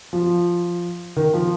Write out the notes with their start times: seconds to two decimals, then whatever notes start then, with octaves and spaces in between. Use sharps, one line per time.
0.13 F3
1.16 D#3
1.34 F3